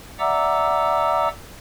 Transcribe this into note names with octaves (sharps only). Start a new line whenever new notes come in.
D5 E5 F#5 A#5 D6 E6